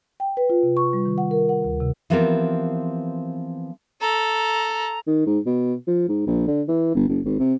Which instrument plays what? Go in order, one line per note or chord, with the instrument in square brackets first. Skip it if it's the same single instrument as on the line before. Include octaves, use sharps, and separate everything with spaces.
[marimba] G5
B4
F4
C3
C#6
G3
D#3
F#5
A#4
F#5
D2
C3
[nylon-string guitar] E3 F3 B3 C4 G4 A#4
[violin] A4 [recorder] A#5
[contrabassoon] D#3
G#2
B2
F3
G#2
A#1
D3
E3
G1
F#1
G#1
C3